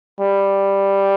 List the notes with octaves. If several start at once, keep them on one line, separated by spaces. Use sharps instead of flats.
G3